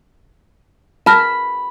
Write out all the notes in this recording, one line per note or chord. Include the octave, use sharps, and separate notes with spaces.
A5 B5 F6 A#6